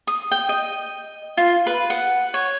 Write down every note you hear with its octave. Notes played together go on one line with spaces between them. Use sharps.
D#6
G5
D#5
F4
B4
F#5
C#5